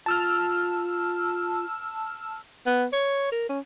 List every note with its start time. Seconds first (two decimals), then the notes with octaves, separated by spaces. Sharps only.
0.06 F4 A5 E6 F6
2.66 B3
2.93 C#5
3.32 A#4
3.49 C#4